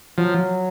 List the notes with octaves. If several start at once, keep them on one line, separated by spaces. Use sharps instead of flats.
F3 F#3